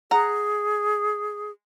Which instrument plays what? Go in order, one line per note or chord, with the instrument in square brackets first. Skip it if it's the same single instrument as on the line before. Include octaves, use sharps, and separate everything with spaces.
[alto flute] G#4 [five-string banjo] F#5 A#5